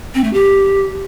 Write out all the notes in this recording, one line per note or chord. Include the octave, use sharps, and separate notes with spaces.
C4
A3
G4